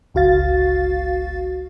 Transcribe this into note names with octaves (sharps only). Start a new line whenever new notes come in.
G1 C#2 F#4 F5 A6